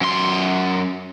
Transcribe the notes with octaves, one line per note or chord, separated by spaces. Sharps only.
F#2 C6